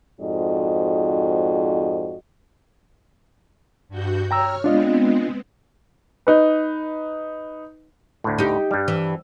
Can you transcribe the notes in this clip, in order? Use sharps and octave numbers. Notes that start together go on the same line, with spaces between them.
F2 G#2 F#4 D5 D#5
G2 F#4 G6
C#5 G5 A#5 E6 F6
G#3 B3 C4 D4 F4 D#5
D#4 B4
D2 A2
D#4 G4
G2 G3
E3